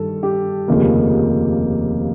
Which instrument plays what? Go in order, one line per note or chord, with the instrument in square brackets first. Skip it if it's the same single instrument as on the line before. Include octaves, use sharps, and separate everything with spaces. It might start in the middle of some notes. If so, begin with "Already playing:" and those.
Already playing: [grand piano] G2 D#3 G3 A4
G4
F1 D#2 C#3 F3 A#3